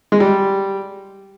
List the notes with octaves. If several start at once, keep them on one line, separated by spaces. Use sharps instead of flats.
G#3
G3